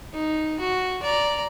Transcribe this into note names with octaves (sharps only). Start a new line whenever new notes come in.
D#4
F#4
D5 A#5